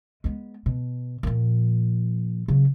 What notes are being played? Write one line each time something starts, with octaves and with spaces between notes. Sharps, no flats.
G#3 B3
B2
A#2 F3
C#3 F#3